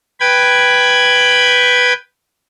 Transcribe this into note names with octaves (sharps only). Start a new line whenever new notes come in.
B4 G5 B5 G#6